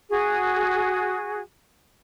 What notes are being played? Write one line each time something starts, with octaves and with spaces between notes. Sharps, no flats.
F#4 G#4